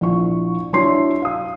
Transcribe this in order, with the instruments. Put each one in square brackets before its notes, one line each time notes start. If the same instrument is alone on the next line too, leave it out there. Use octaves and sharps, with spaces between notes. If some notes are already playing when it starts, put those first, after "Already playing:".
[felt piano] A#1 E4 C#6
F#3 D4 E4 C#5 C6 C7
F5 D#6